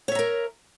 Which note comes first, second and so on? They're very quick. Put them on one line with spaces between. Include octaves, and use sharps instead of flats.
C#5 E5 A#5 A#4